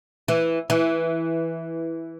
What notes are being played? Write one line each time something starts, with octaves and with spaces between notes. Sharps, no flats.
E3
E3